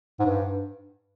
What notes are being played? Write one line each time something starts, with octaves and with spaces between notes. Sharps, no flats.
G#2
G2